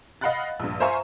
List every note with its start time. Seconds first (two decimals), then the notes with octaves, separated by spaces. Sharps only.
0.21 D#5 F5 F#5 B5 F#6 A6
0.60 A#1 G2
0.80 C5 E5 F5 G#5 A#5 C#6